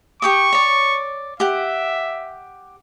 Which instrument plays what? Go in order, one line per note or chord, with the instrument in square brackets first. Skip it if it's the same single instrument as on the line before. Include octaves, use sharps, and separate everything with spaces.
[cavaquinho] G4 G5 D#6 [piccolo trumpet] C#6
[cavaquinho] C#5 D5
[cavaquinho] G4 F#5 [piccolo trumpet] E5